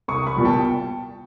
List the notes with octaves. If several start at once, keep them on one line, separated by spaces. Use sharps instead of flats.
C2 C#6 D#6
B5 C#6
A#2 G3 B3
G5 A5